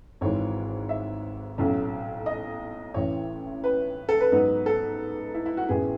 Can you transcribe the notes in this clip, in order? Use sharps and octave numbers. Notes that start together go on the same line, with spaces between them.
G#1 G#2 E3 G#3 C#5
E5
B1 A2 F#3 C#4
D#5
A1 A2 E3 C#5
B4
A4
B4
G#2 F#3 B3 D#4
A4
E4
E4
F#4
A1 A2 E3 B3 G#4